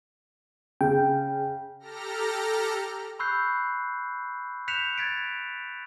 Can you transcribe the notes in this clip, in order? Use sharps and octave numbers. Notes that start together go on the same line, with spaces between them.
C#3 G5
G4 A4 A#5 F6 A#6
B5 C#6 E6 F#6 G6 C7
F#6 G6 B6 C#7 E7 F7
G#6 A6 B6 D7